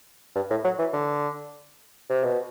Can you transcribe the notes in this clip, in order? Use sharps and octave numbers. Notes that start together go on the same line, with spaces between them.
G2
A2
F#3
E3
D3
C3
B2